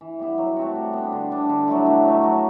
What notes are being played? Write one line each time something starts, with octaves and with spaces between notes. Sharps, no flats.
E3
G3 B3 E4
F#3
A3 C4 F#4
G3
B3 D4
D3
G3 D4
D3
F#3 A3 E4
B2
F#3 A3
F#3